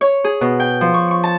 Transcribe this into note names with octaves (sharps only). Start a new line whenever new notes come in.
C#5
G#4
B2
G5
F3
C#6
C#6
A5